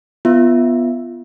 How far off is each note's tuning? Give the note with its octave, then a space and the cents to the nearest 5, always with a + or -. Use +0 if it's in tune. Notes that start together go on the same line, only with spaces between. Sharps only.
B3 +0 F4 -15 E5 +0